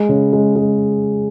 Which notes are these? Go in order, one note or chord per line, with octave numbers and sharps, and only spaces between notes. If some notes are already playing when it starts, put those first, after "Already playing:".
Already playing: G#3
C#3
G#3
G#3